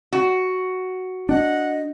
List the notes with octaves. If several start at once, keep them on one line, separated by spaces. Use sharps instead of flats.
F#4
D4 D#5 F#5